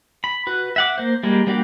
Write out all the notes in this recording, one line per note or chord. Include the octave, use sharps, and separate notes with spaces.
B5
F#4 B4
E5 F#5 D6
A#3 C5
G3 G#3 A#3
G3 A#3 D4 F#4 G4